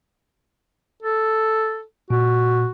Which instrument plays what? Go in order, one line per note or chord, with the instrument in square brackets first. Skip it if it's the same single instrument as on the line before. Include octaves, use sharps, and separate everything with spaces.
[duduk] A4
[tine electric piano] A#2 [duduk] F#4